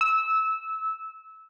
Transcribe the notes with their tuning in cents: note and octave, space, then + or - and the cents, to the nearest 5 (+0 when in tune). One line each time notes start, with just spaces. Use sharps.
E6 -15